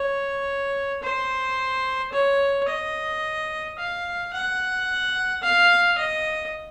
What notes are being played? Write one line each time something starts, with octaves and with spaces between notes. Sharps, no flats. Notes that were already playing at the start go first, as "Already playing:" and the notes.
Already playing: C#5
C5
C#5
D#5
F5
F#5
F5
D#5